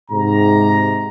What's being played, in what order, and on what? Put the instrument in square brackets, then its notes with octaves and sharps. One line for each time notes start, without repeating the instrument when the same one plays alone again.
[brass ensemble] G#2 C3 A#5